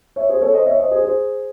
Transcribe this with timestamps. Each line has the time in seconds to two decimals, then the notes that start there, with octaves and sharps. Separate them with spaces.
0.16 C#5 E5
0.29 G#4 C5
0.41 A4 C#5
0.53 C5 D#5
0.66 C#5 E5
0.79 C5 D#5
0.91 G#4 C5
1.04 G#4 C5